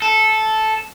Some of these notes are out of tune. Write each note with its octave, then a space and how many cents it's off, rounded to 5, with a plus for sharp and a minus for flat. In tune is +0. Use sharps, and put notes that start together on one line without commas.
A4 -10